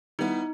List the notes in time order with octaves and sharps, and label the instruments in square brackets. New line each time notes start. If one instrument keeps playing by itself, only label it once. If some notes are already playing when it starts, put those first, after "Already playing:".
[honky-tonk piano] G3 B3 E4 [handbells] D#4